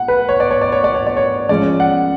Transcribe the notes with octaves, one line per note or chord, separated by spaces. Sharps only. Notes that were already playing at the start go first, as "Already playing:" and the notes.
Already playing: F#5
B4
C#5
D5
C#5
D5
C#5
D5
C#5
D5
C#5
F3 G#3 C#4 D5
F#5